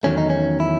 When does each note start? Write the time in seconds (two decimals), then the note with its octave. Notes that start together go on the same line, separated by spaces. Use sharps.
0.03 E2 D#3 F#3 A3 C#4
0.18 D#4
0.30 C#4
0.60 E4